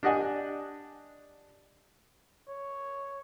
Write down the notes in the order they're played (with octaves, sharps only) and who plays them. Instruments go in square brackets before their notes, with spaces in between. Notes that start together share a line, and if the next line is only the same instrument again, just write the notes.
[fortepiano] D4 G4 D#5 F#5 G#5
[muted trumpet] C#5